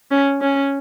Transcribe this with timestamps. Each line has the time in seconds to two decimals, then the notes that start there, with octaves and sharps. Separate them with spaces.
0.11 C#4
0.41 C#4